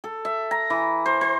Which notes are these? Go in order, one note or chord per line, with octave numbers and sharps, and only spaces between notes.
A4
E5
A#5
E3
C5
C5